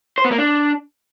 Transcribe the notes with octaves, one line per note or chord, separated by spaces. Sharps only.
C5
B3
A#3
D4